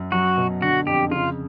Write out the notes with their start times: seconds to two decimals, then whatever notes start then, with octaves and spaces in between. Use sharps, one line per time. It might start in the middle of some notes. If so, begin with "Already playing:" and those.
Already playing: F#2
0.12 F#3 F#4
0.37 B2
0.61 D3 F#4
0.87 F2 G4
1.11 C#3 F4